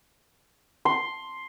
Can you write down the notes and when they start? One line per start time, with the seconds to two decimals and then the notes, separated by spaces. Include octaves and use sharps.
0.85 C6